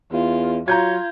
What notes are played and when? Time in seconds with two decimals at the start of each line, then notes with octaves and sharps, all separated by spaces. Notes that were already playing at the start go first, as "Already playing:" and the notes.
0.12 E2 F4
0.68 F#3 F4 A#5 G6 G#6